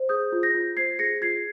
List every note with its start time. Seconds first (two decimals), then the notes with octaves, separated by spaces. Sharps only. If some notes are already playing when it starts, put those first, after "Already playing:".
Already playing: C5
0.09 G#4 D#6 G6
0.32 F4
0.43 G6 A#6
0.54 F4
0.77 C5 G#6 C7
0.99 G#4 A#6 C#7
1.21 F4 G#6 C7